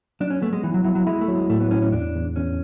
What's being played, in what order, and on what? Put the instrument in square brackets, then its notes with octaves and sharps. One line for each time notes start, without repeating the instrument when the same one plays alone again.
[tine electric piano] F#3 [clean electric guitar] D4
[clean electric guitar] C#4
[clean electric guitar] A3 [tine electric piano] B3
[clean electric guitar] G#3
[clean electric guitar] E3 [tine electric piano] E4
[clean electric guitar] F#3
[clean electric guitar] F#3 [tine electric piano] E4
[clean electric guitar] F#3
[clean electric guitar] G#3 [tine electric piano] E4
[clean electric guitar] A3
[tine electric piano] F#3
[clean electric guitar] G#3
[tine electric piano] A2 [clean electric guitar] A3
[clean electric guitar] B3
[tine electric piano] A2 [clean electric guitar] C#4
[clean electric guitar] C#4
[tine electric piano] E2 [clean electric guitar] D4
[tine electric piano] E2
[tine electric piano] E2 [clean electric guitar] C#4